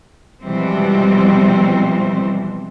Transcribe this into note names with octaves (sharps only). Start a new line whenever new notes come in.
B2 E3 F3 G3 G#3 C4